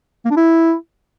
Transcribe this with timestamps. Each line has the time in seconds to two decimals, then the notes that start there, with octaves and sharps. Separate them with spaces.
0.25 A#3
0.31 D4
0.37 E4